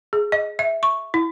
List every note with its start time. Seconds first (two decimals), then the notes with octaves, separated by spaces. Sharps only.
0.13 G#4
0.32 D#5
0.59 E5
0.83 C#6
1.14 E4